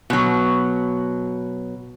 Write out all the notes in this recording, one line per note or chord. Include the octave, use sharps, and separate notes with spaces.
B2 F#3